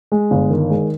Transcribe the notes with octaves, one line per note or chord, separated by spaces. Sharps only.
G#3
G1
D#3
G#3